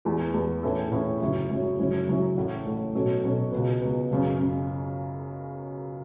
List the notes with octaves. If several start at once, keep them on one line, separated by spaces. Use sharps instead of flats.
E2 E3 B3
E2 E3 B3
A2 E3 C#4 E4 A4
A2 E3 C#4 E4 A4
F#1 F#2 F#3 C#4 E4
F#1 F#2 F#3 C#4 E4
F#1 F#2 F#3 C#4 E4
F#1 F#2 F#3 C#4 E4
A1 A2 A3
A1 A2 A3
B2 F#3 C#4 A4
B2 F#3 C#4 A4
C#2 B2 B3
C#2 B2 B3
F#1 F#2 C#3
C#3